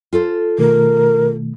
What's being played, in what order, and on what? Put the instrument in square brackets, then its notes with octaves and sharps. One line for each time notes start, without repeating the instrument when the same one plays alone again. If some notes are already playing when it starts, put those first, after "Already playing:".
[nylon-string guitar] F4 A4 C5
[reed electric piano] B2 D#3 A3 [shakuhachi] A#4